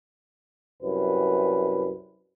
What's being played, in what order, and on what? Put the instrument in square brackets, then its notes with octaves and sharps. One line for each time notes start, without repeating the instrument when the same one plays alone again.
[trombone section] C2 F#2 B4